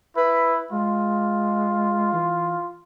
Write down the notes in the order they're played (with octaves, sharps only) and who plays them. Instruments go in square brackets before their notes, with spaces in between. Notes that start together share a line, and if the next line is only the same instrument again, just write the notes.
[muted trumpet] E4 [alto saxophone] B4
[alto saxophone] G#3 [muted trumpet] F4
[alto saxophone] E3